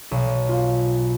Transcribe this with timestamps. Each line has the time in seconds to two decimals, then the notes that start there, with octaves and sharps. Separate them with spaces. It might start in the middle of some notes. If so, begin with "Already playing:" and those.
0.11 B1
0.49 F4